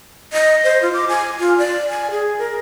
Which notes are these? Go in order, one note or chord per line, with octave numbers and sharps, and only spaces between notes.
D#5
C5
F4
D6
G#5
F4
D5
G#5
G#4
A#4